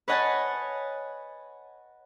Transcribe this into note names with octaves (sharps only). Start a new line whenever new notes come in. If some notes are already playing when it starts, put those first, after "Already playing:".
B4 C#5 D#5 F#5 G#5 A5